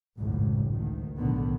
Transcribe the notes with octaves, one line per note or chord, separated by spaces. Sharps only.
G#1 C#2 F#2 A2
D2 D#3
B1 A2 D3 D#3 B3